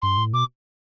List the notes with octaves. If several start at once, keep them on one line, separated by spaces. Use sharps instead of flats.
G2 C6
A2
B2 D6